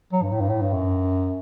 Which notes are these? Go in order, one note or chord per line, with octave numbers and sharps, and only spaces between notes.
F#3
G2
A2
G2
A2
G2
F#2